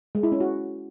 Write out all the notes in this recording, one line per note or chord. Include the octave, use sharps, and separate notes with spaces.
G#3
E4
C#4
F#4